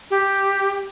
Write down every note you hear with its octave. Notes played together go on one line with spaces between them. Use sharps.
G4